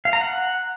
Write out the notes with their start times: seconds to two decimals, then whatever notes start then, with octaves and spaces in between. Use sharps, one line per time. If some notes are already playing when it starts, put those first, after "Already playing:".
0.05 F5
0.13 A#5
0.21 F#5